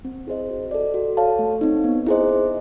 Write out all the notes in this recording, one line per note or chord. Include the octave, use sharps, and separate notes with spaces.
C4
E4 G#4 C5 D#5
F#4
A4 D5
F#4
A4 C#5 F5 A5
A3
C4 D#4
B3
E4 G#4 C5 D#5
E4